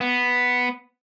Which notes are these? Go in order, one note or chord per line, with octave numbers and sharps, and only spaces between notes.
B3